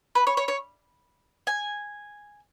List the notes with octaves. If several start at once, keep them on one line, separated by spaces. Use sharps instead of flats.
B4
C#5
C#5
C#5
G#5